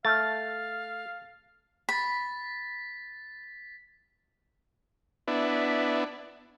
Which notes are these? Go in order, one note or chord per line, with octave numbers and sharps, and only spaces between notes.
A3 F5 A5 F6 A6
B5 A6 B6
B3 D4 E4